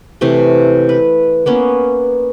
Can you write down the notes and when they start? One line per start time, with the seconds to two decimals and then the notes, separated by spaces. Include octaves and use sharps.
0.21 C3 E3 A3 C6
0.89 B4
1.46 A#3 B3 C#4